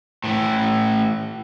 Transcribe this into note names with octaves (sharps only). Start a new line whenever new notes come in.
A2 E3